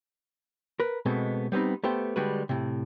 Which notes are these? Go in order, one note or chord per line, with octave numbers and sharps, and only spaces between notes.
A#4 B4
B2 G#3 A3 B3 C4
G3 B3 C4 D#4
A3 B3 G4 C5
D3 G3 G#3 F#4 B4
A2 C3